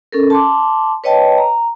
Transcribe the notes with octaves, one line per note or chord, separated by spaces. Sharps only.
C#4 A4 A#4
A5 C6 D6
B4 C#5 D#5 G5 A5
A#5